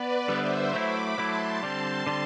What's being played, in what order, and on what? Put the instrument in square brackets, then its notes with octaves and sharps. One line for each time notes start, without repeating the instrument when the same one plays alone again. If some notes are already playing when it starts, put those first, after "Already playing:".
Already playing: [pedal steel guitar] B3 [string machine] B4 D5
[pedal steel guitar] D3 G3 B3 [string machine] C5 E5
[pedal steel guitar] F#3 A3 E4 [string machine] B5 D6
[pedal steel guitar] F#3 A3 E4 [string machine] A5 C6
[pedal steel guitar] D3 G3 C4 [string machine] A5 C6
[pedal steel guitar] D3 G3 C4